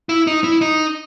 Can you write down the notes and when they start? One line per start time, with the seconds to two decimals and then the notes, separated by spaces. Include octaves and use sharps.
0.09 E4
0.27 D#4
0.44 E4
0.61 D#4